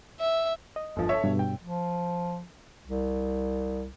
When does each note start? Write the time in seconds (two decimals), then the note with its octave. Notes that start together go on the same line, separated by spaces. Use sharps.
0.20 E5
0.76 D#5
0.96 G1 F3
1.09 A4 C#5 E5
1.24 G2 B2
1.39 G5
1.63 F3
2.86 C2